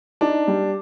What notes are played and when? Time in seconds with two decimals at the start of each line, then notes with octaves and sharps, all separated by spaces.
0.21 D4 D#4
0.48 G3